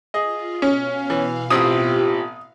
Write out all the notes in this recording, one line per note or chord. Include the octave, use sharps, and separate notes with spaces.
F4 G#4 D#5
B2 C#4 F5
E3
A1 C4 E4 F4 G4 D#6